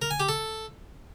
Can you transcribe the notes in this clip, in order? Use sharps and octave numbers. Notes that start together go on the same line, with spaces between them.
A#4
G#5
G4
A4